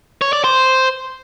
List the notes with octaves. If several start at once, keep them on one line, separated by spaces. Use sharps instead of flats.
C#5
D5
C5